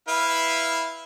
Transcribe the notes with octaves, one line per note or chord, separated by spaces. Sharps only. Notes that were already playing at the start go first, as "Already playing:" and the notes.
E4 B4 F5